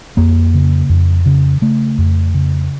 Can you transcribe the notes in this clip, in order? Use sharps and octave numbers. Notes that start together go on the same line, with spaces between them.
F2 A#3
C#3
F2
C#3
C#3 A3
F2
C#3